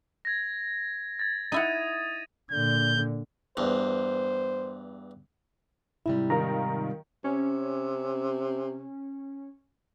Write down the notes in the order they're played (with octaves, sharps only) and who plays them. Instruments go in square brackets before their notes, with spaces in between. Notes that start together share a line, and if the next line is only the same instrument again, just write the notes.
[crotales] G#6 A#6
G#6 A6
[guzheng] D#4 E4 F#5 [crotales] D#6 D#7
[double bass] A#2 D3 [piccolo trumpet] G6
[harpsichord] E2 G2 [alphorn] C5
[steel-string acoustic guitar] G#2 C3 G3 [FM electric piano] E4
[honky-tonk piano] D#3 F4 A#4 [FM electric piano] A#5
[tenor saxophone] C3 [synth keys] C#4